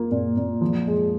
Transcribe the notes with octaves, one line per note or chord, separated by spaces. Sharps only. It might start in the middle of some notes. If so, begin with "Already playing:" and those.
Already playing: A#3 F4
A#2
A#2
F3
G#3